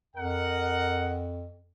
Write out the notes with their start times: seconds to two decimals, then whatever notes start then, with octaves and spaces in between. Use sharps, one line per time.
0.16 F2 A#4 D#5 F#5